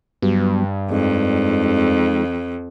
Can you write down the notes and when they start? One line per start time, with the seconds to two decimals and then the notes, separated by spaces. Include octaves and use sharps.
0.22 G2 F#3 G3 B3
0.92 F2 G#3 D#4